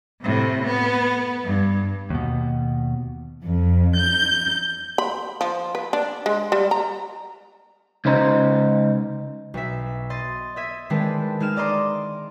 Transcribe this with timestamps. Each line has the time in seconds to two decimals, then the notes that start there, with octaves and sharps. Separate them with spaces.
0.22 A2 C3
0.65 B3
1.44 G2
2.10 D#2 B2
3.44 F2
3.97 G6
4.98 B5
5.41 F3
5.75 B4
5.93 D4
6.26 G#3
6.52 G3
6.71 A#5
8.05 C#2 C#3 D#4 C5 A#5
9.54 B1 E5
10.10 D#5 C6 A6
10.56 D#5 E5 G#6
10.90 D#3 G#3 C4 D4 B4 A5
11.40 G#3 D#4 F6 E7
11.57 D5 D#5 A#5 C6 D6